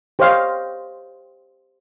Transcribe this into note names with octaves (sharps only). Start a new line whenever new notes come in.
G4 C5 C#5 D#5 F5